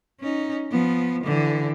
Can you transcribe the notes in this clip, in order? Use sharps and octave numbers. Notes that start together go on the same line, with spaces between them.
C#4 D#4
F3 B3
D3 E3